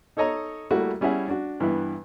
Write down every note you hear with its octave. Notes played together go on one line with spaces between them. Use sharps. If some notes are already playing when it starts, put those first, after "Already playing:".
D#4 A4 C#5 D#5 A#5 D#6
G3 A3 A#3 E4 F#4
G3 C#4 E4 G#4 E5 F#5
D4 F#4
G2 E3 B3 E4